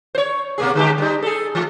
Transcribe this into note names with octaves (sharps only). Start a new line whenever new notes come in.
C5 C#5
B2 A#3 G#4
D3 G#3 G4
G3 D#4
G#4 A4
E3 F3 A3